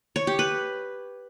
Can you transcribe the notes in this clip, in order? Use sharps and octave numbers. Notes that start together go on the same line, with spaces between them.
C#5
G4
B4